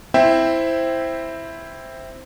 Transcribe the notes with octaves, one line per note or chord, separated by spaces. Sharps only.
C4 E4 C5 E5 G5